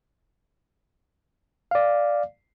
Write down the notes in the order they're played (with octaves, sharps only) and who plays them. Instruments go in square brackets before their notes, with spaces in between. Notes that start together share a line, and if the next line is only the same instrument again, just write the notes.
[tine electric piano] D5 F5